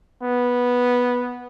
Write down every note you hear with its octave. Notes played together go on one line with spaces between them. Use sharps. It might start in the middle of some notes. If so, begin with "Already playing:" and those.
B3